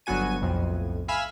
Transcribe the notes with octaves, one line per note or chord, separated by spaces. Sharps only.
G1 F#3 B3 F#4 G#5 D#7
B1 F2 A2
E5 F5 G#5 B5 E6 F6